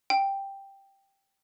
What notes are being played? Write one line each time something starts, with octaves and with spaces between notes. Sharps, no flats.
G5